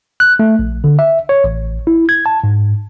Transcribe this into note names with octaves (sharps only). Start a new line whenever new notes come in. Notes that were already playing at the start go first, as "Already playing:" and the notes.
F#6
A3
A#1
D3
E5
C#5
A1
E4
G#6
A5
G#2